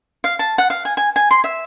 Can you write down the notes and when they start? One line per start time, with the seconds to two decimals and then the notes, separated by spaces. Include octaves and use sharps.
0.24 F5
0.39 A5
0.58 F#5
0.70 F5
0.85 G#5
0.97 G#5
1.16 G#5
1.31 C6
1.44 E5